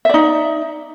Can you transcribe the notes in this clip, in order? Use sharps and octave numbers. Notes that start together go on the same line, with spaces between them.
D#4 D5 E5